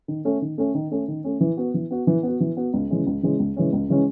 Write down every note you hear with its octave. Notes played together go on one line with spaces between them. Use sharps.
D#3
A3 C#4
D#3
A3 C#4
D#3
A3 C#4
D#3
A3 C#4
E3
B3 F#4
E3
B3 F#4
E3
B3 F#4
E3
B3 F#4
C#2
C#3 E3 G#3 C#4
C#2
C#3 E3 G#3 C#4
C#2
C#3 E3 G#3 C#4
C#2
C#3 E3 G#3 C#4